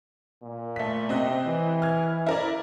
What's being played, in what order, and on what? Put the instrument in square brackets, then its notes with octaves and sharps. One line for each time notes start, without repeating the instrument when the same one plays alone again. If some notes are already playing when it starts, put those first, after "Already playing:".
[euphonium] A#2
[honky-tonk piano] A3 B6
[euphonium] C3 [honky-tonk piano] C4 D#5 F#6
[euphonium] E3
[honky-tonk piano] F6 G#6
E4 A#4 D5